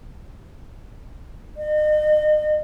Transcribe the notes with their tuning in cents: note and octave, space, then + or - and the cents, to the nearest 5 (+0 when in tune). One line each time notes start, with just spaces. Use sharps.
D#5 -40